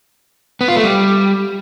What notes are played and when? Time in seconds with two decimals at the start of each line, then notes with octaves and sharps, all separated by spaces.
0.61 B3
0.68 F4
0.76 A3
0.83 G3